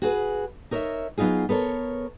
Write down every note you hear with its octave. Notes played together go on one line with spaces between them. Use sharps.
F#4 G#4 B4
D#4 A#4 C#5 D#5 E5
F#3 B3 D#4 F4 G#4
B3 A4 A#4 C#5